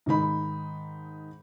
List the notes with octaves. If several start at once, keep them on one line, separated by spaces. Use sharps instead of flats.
G#2 D#3 D#4 B5